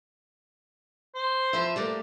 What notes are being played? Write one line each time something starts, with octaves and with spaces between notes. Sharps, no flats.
C5
F3 B4 E5
G3 A3 A#3 D5